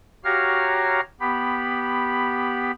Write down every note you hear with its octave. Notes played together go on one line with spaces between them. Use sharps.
F#4 G4 C#5 F5 A#5 F6
B3 G4 B5